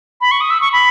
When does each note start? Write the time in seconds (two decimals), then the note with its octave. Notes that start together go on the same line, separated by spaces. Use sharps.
0.21 B5
0.31 C#6
0.41 D#6
0.50 E6
0.61 C#6
0.73 B5